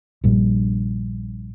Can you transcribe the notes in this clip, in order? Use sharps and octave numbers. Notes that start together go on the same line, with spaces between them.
A#1 G2